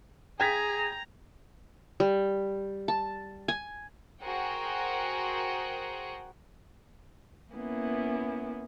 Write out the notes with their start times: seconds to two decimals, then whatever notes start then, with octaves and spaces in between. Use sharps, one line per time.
0.40 G#4 G5 A#5 G#6 B6
2.00 G3
2.88 A5
3.48 G#5
4.21 F#4 G#4 A#4 C5 F#5 G5
7.53 A#3 B3 C#4 E4